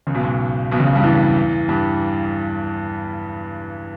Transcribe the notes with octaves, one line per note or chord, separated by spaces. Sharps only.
C#2 C#3
B1 B2
G#2
B1 B2
C#2 C#3
G2 G3
E2 E3
G2 G3